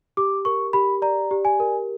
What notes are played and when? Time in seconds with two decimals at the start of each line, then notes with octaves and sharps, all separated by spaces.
0.17 G4 D6
0.45 A#4 C#6
0.73 G4 B5
1.02 D5 A#5
1.31 G4
1.45 G#5
1.60 A#4